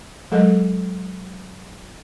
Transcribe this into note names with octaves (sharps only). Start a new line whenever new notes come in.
F#3 G#3 A4 A#4 D#5